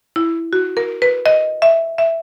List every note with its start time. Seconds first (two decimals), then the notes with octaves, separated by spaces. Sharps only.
0.16 E4
0.53 F#4
0.77 A#4
1.02 B4
1.26 D#5
1.62 E5
1.98 E5